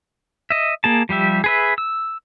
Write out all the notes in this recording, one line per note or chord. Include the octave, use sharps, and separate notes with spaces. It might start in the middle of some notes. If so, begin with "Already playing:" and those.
D#5 E5
A#3 G#4 A5
F3 G3 G4 E5
G#4 B4 E5
E6